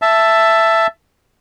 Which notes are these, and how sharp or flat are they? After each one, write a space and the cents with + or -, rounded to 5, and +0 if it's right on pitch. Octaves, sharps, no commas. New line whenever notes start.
E5 +10 A5 +0